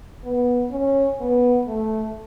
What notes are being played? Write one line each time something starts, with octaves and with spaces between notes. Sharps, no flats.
B3
C#4
B3
A3